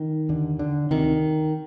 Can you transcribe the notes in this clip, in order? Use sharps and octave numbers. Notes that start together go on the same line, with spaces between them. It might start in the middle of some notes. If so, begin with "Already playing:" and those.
Already playing: D#3
D#2 D3
D3
D2 C3 D#3